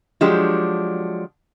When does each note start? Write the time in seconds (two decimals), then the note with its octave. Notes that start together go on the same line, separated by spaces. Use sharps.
0.21 F3 F#3 G#3 D4 G4